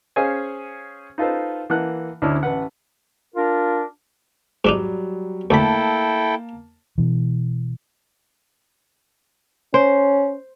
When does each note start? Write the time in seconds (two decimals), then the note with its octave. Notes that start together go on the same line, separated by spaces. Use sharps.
0.16 C#4 G#4 C5 C#5 F5 G#5
1.18 D#4 F4 A4 B4 C5
1.70 E3 A#3 F#5 A5 F#6
2.22 D2 C#4 D4 E4 F6
2.43 A1 B4 F#5
3.35 D4 F4 A#4
4.65 G#2 F#3 G3 D4 D#4
5.50 D2 A#3 E4 A4 G5 A5 B5
6.98 B2 E3
9.74 C#4 C5